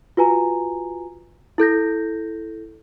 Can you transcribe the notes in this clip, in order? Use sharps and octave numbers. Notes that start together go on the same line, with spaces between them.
F4 F#4 B4 G#5 A#5
E4 A4 G6 A#6